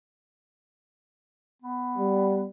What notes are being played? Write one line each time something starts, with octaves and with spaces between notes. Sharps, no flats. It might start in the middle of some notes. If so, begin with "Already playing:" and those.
B3
G3